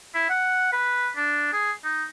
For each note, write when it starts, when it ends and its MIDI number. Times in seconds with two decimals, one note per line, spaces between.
0.14 0.26 64
0.30 0.69 78
0.72 1.10 71
1.16 1.48 62
1.53 1.72 68
1.84 2.04 63